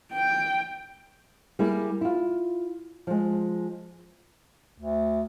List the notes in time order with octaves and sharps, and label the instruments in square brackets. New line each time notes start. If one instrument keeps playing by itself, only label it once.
[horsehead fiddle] G5
[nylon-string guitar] G3 A#3 E4 G4 G#4
E4 F4
F3 G#3
[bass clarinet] D2